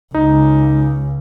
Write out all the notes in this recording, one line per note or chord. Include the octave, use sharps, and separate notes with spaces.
C#2 D#4